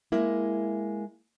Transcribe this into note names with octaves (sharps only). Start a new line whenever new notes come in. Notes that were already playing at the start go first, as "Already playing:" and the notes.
G#3 A#3 E4